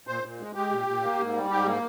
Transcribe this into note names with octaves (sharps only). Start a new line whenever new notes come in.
A#2 C5
A#2
G#3
G#3 G4
A#2
A#2
A#3
G#2
G3
G#2 G4
A#3